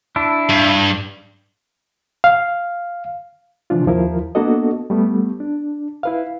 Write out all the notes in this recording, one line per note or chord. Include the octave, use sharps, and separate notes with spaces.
D4 E4
G2
F5
C3 E3 F3 D4 F4
D#2 F3 E4 A#4
A#3 B3 D4 F#4 A4 D#5
G3 A3 B3
D4
E4 B4 F5